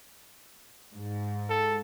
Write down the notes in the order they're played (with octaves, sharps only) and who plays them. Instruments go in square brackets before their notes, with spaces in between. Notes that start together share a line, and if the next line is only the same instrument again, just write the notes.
[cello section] G#2
[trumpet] A4